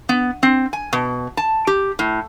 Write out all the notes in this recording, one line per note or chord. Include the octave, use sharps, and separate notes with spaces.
B3
C4
G#5
B2
A5
G4
A2